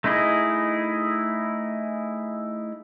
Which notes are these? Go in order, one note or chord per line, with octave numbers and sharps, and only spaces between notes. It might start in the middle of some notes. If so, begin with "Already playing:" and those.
A3 D#4 E4 G#4 D#5